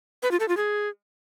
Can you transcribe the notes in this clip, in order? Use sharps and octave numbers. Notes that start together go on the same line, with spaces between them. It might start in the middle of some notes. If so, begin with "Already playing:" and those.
B4
F4
A4
F4
G#4